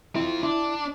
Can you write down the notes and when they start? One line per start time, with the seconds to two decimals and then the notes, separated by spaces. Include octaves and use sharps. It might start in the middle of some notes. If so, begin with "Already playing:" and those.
0.15 C4 E4 F4
0.43 D4 E4